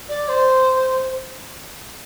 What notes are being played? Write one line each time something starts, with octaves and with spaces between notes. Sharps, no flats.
D5
C5